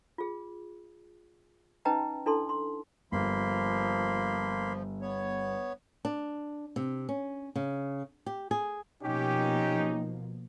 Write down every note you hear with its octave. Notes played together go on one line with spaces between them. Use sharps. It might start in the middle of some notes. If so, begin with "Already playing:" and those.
F4 G#4
C#4 D#4 B4 D#5 G5 A#5
D4 E4 A4 A5 C6
C6
G1 F3 A#3 B5 C6
B3 C#5
D4
C3
C#4
C#3
G4
G#4
B2 F3 A#3 C#4 D#4 G4